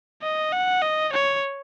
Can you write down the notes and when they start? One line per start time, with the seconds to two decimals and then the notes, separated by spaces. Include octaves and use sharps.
0.22 D#5
0.52 F#5
0.82 D#5
1.13 C#5